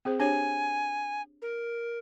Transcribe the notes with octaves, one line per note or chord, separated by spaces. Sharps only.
C4 G#4 C5
D4 G4 C#5 G#5
A#4